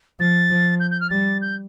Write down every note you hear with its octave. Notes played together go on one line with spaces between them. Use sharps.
F3 A6
F3
G6
G6
F6
G3 A6
G6